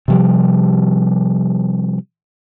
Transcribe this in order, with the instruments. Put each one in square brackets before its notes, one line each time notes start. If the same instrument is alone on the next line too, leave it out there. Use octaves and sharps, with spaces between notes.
[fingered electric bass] C3 F3 G3